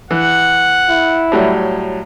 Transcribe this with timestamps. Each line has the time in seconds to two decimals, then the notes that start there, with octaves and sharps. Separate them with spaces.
0.11 E3 F#5
0.89 E4
1.32 A2 F#3 G3